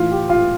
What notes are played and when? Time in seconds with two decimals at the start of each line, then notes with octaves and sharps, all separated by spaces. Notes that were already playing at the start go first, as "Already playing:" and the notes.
Already playing: A2 E3 F4
0.11 G4
0.29 F4